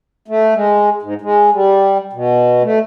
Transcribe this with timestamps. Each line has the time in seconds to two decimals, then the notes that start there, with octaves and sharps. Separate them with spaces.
0.28 A3
0.54 G#3
1.03 G#2
1.21 G#3
1.53 G3
2.13 B2
2.63 A3